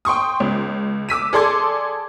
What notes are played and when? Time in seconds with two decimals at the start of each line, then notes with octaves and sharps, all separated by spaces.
0.05 G5 C6 C#6 D#6
0.40 C#2
1.09 D6 E6 B6 D#7
1.33 G#4 A4 D5 C6 D6 G#6